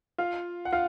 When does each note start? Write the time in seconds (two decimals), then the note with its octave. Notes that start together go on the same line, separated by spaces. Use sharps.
0.18 F4 F5
0.65 F#5
0.73 F4 F5